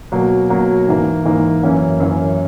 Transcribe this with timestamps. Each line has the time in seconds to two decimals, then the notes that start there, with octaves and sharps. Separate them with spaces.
0.12 B2 F#3 A#3
0.50 B2 F#3 A#3
0.87 G#2 E3 A#3
1.25 G#2 E3 A#3
1.63 F#2 E3 A#3 C#4
2.00 F#2 E3 A#3 C#4